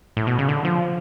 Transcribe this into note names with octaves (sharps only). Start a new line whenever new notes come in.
A2
B2
C#3
D3
F3